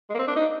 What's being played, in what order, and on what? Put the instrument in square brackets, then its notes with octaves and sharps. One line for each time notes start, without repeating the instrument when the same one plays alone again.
[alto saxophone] G#3
A#3
C4
D4
D#4